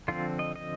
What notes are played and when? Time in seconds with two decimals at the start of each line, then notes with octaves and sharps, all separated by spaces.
0.08 D3 F3 C4 F4
0.39 D#5
0.56 D#5